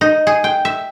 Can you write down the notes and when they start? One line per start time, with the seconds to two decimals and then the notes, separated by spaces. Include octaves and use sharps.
0.01 D#4
0.27 G#4
0.44 G5
0.65 E5